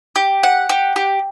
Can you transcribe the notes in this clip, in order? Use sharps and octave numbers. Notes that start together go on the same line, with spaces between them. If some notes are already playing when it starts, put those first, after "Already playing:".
G4
F#5
G4
G4